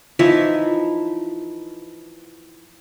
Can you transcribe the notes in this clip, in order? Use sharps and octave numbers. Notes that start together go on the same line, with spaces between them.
E3 F3 D#4 E5